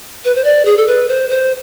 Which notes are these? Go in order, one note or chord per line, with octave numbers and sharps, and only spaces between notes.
B4
C5
D5
G#4
A4
B4
C5
C5